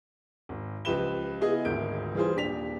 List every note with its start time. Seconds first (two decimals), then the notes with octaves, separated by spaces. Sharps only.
0.49 G#1
0.85 C#2 F3 G4 B4 E7 G7
1.41 B3 E4 F4 G#4 D#5 G#5
1.65 G#1 D2 A#4 G6 D7
2.15 E3 G3 F4 G#4 C5
2.36 D#1 D4 G4 B6 F7